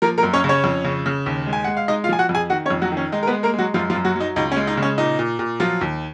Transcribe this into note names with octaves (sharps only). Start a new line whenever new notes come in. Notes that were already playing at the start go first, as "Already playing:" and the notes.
F3 A#3 A#4
A#3 A#4
F#2
C#4 C#5
C#3
C#4 C#5
F2
C#3
C#3
D#2
G#3
G#5
G#3 F#5
F5
G#3 D#4 D#5
F4 F5
F3 G#5
F#4 F#5
F2
G#4 G#5
D#3 F#4 F#5
C#4 C#5
F2
F#3 F#4
D#3
C#4
G#3 D#4
A#4
B3 B4
G#3
A#3 A#4
F#3 G#3 F#4
F#2 F3 F4
F3 F4
F#2
F#3 F#4
F#3 D#4
C#2 D#4
C#4
G#3
D#4
C#3
C#4
A#2 D#4
A#2
A#2
F3 F#3 F4
D#2